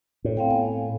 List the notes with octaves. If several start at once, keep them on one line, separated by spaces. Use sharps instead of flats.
A2
C4 F5 G5
B3 G#5